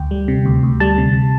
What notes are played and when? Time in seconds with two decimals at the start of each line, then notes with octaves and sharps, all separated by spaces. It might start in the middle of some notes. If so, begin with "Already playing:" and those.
Already playing: D2 G5
0.11 G3
0.28 C3
0.46 D2
0.63 D2
0.80 G3 A5
0.98 C3